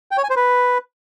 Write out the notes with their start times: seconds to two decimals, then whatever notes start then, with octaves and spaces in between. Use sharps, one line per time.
0.11 G5
0.18 C#5
0.24 G#5
0.30 C5
0.36 B4